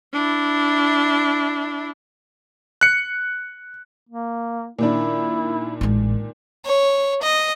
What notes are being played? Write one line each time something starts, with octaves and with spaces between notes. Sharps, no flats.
D4 E4
F#6 C#7
A#3
A#2 D#3 D4 E4
A1 G#3
C#5
D#5